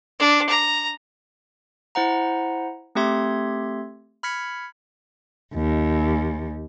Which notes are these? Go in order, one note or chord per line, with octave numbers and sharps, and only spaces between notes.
D4
A#5
E4 C5 F#5 A#5
A3 C4 G4 E5 C6 G#6
B5 F6 G#6 B6 C#7
D#2